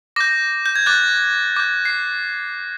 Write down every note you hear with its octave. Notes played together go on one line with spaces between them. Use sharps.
D6 G6 A#6
G6
G#6
D6 F#6 A6
D6 G6
C7